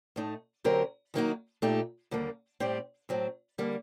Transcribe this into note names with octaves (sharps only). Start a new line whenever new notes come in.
A2 A3 D#4
D3 F#3 C4 G4 A#4
D#3 F#3 A#3 D#4 F#4
A#2 A3 D#4 G4
D#2 D3 G3 A#3
A2 G3 C4 G4 D5
A2 F#3 C4
D3 G3 A#3